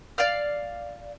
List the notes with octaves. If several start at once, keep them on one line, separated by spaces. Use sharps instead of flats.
D5 F5 F6